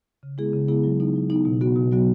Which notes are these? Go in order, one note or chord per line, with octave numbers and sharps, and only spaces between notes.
C#3
G#3 B3 E4 G#4
C#3
G#3 B3 E4 G#4
F#3
B3 D#4
F#3
B3 D#4
B2
F#3 B3 F#4
B2
F#3 B3 F#4